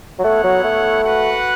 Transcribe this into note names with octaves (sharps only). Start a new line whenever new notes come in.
F#3
A3 B3 E4 C#5 F#5
F#3
A3
F#4 B4 F#5